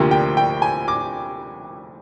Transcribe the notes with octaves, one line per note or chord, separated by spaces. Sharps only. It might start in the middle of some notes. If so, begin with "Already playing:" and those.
Already playing: D2 C3 F3 A#3
G5
G5
G#5
D6